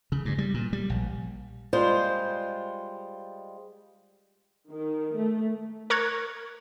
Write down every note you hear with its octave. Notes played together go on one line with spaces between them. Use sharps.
C#3
G2
G3
A#2
G3
A#1
G3 G#3 F4 C5
D#3
A3
A#4 A#5 C#6 F#6 G#6